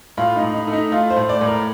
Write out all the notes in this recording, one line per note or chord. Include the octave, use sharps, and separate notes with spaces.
A2 F4
D#4
A2
D#4
A3
D#4
A3 F4
C5
A2
D5
A2
A#4